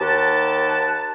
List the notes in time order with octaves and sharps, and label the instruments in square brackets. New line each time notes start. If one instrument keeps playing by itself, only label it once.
[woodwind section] D#2 G4 F#5 A5